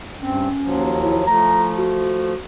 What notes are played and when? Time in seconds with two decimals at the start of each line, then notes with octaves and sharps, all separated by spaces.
0.21 G2 C4 C#4
0.62 D#2 F3 F#3
1.02 E4
1.27 F3 A3 A#5
1.78 F#4